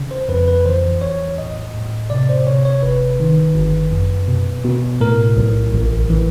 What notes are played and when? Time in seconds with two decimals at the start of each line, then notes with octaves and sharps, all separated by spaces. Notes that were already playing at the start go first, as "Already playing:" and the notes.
Already playing: C#3
0.11 C5
0.29 F2 B4
0.48 B4
0.66 E3 C5
1.02 E2 C#5
1.38 A2 D#5
1.75 A2
2.10 C3 D5
2.29 C5
2.47 C3 C#5
2.65 C#5
2.82 G1 B4
3.20 D#3
3.55 G1
3.91 F#2
4.28 B2
4.64 B2
5.00 A2 A#4
5.37 B1
5.74 A1
6.10 E3